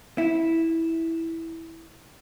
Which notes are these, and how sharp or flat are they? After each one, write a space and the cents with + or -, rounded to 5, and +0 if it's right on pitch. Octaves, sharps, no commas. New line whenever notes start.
E4 -10